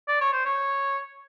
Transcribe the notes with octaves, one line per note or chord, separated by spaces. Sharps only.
D5
C#5
C5
C#5